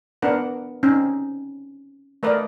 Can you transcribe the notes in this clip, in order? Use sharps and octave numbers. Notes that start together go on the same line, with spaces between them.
B3 D4 A#4 F#5
C4 C#4 D#4
A3 A#4 B4 D5 D#5